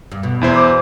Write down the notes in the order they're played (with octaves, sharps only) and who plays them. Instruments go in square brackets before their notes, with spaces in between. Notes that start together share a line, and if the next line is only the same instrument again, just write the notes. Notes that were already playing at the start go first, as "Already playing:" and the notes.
[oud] G2
B2
[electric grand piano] E2 E4 C5
[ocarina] D6